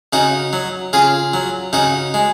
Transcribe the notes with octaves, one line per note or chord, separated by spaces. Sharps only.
C#3 D#4 F#4
F#3
C#3 F4 G#4
F#3
C#3 D#4 F#4
G#3